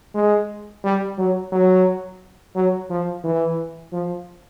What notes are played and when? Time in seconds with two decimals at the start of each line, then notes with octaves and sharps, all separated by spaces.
0.14 G#3
0.84 G3
1.18 F#3
1.52 F#3
2.55 F#3
2.90 F3
3.24 E3
3.92 F3